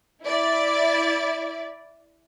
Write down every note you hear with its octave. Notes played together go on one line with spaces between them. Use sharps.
E4 D5